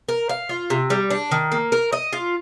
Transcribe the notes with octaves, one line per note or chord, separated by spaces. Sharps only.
A#4
F5
F4
C3
G3
D4
D#3
A#3
A#4
D#5
F4